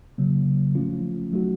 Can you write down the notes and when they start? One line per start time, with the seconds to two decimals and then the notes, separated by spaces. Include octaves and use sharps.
0.18 C#3 F#3 A#3
0.75 F3 A3 C#4 F4
1.33 F#3 A3 D#4 F#4